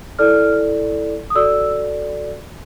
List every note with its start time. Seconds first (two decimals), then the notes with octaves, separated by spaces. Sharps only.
0.19 E4 A4 D5 F6
1.30 D#6
1.35 F#4 A4 D5 E6